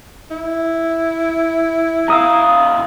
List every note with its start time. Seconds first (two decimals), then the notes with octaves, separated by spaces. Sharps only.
0.31 E4
2.08 E2 F5 A#5 D#6 E6